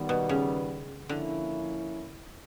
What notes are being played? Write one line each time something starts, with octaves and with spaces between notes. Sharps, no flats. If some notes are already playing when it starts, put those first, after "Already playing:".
Already playing: D#3 G3 B3
B2
C#3
D3 F3 A#3 C#4 E4